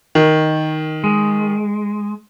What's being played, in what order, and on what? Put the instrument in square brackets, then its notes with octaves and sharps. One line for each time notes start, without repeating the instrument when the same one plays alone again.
[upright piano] D#3
[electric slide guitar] G#3